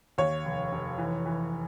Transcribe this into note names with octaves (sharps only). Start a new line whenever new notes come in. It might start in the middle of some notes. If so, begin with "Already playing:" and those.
D#2 C#5
F1
F1
E3
E3